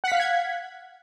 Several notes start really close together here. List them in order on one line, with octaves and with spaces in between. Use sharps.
F#5 B6 F5 F#6 G#6